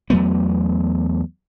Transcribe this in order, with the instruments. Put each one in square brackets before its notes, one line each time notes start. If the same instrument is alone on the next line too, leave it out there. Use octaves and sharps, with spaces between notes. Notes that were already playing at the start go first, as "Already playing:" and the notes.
[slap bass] E2 F#3 A3 B3